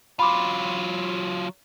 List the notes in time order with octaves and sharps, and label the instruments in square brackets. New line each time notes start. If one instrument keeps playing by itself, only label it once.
[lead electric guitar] F#3 F4 [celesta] B5 C6 D6